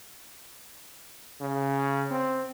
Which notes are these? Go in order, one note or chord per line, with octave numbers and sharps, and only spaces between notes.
C#3
C4